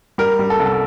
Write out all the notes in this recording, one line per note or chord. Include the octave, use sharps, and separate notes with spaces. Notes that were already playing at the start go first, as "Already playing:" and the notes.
G3 A#4
G3
A4
C2
A4